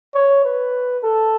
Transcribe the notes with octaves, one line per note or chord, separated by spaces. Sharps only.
C#5
B4
A4